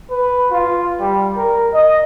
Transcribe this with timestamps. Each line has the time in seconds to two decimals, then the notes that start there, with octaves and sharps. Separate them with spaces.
0.11 B4
0.51 F4
1.00 G3
1.36 A#4
1.73 D#5